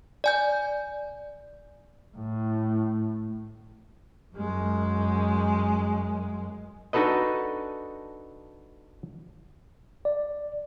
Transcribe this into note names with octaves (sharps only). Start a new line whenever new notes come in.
D5 G#5 G6
A2
F#2 G#3
D4 D#4 F#4 A4 B4 D#5
D5